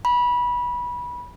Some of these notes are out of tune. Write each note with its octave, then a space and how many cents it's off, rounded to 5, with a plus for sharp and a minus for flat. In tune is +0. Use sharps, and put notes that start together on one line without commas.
B5 -20